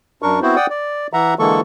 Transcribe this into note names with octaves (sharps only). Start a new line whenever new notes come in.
F#2 D4 A#4 C#6
B3 C4 E4 F#4 C5
D5 F#5 G5 D#6
D5
E3 E5 F#5 A#5
D3 E3 G#3 A#3 A4 C#6